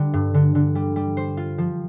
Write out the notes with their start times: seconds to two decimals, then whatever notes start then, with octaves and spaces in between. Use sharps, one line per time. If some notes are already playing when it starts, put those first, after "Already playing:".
Already playing: D3 G3
0.14 G2
0.34 D3
0.55 D3
0.75 G3
0.96 G3
1.17 C5
1.37 F4
1.58 F3